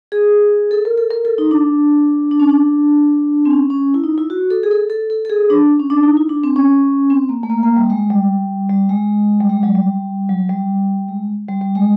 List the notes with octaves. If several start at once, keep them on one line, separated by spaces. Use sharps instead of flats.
G#4
A4
A#4
A4
A#4
A4
D#4
D4
D4
C#4
D4
C4
C#4
C#4
E4
D#4
E4
F#4
A4
G#4
A4
A4
A4
A4
G#4
D4
C#4
D4
D#4
E4
D4
C4
C#4
C4
A#3
A3
A#3
A#3
G3
G#3
G3
G3
G#3
G3
G#3
F#3
G3
F#3
G3
G#3
G3
G3
G#3